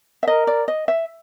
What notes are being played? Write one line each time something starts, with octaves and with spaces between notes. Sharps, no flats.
E5
A#4 D#5
D5
D#5
E5